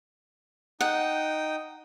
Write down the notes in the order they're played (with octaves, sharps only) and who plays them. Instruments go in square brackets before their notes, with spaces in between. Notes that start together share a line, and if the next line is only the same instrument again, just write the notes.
[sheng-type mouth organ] D#4 G5 D#6 [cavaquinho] F#5